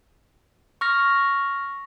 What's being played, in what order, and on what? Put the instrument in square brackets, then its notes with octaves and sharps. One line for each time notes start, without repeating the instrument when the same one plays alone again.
[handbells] C#6 F6 A#6